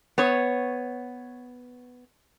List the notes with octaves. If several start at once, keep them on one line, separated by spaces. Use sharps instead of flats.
B3 C#5